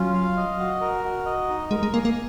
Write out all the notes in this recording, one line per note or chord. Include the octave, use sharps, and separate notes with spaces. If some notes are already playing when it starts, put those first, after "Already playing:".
Already playing: F#3 C#4 F4
F5
D#5
F#4
A#4
F#4
D#5
D#4
G#3 A#4
G#3
A#3 G#5
A#3